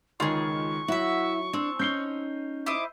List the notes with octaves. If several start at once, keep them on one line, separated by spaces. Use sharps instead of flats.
C#2 D#3 F4 G#4 C#6
F#3 E4 F#4 E5
C4 D4
C#4 D#4 G6 C7 G7
E4 C5 D#5 D6